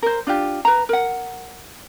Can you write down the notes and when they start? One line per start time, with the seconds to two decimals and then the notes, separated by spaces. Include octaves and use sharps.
0.03 A#4 C5
0.27 D4 F4 G4
0.65 B4 A#5
0.89 A#4 F#5